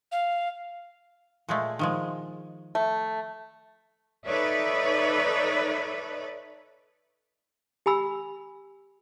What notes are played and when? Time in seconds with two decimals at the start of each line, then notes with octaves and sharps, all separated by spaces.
0.12 F5
1.49 A#2 G#3 A3
1.79 D#3 F3 G#3
2.75 A3
4.26 D#4 A4 B4 C#5 D5 E5
7.86 G4 G#5 B5 E6